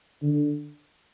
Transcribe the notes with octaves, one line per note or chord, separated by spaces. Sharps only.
D3